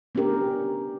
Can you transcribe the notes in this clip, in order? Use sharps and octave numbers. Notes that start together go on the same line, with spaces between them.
B3 C#4 D4 G4 A#4